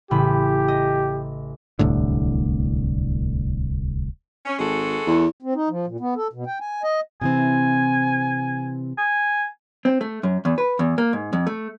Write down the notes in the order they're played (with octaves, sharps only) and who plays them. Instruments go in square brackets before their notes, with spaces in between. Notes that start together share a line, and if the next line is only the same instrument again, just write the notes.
[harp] A1 C#3 B5 [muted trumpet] G4
[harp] D#5
[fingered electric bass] D1 C2 A2 D3
[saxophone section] C#4
[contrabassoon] G#1 [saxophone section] G#3 F#4 A4
[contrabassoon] E2 [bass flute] E4
[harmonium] C4
D#4
F3
A#2
B3
A4
B2
G5
G#5
D#5
[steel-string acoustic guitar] C3 E3 C4 [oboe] G#5
[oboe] G#5
[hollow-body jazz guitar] C4
A3
F#2
E2
B4
E2
A#3
G#2
F2
A3